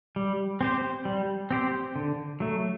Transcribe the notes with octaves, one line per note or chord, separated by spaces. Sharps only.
G3
C4 G4 C5
G3
C4 G4 C5
D3
F#3 A3